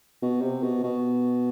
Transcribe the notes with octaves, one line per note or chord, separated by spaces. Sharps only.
B2
C3
B2
B2